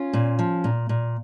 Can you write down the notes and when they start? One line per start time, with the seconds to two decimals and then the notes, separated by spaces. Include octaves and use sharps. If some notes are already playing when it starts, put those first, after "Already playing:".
Already playing: C#4 F4
0.13 A#2
0.39 F3
0.64 A#2
0.89 A#2